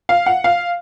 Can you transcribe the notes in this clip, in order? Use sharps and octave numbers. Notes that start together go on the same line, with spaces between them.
F5
F#5
F5